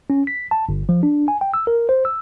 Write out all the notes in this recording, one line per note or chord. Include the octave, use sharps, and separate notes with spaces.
C#4
B6
A5
G1
F3
D4
G#5
G5
E6
A#4
C5
E6